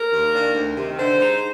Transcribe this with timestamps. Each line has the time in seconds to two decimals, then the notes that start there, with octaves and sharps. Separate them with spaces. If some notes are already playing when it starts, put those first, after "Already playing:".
Already playing: A#4
0.11 D#2
0.33 D#3 A#3 D4
0.55 D2
0.77 C3 D#3
0.98 D3 C5
1.20 G#3 D#4